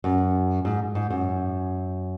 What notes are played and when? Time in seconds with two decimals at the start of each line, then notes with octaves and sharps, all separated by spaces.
0.04 F#2
0.65 G#2
0.95 G#2
1.10 F#2